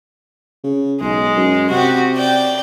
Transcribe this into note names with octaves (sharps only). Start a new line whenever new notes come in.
C#3
B1 G#3
F#2
C3 F#4 G4
D5 G5